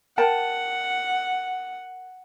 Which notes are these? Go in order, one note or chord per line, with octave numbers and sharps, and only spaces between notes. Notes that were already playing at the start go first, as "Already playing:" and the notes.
A#4 F#5 G5 A5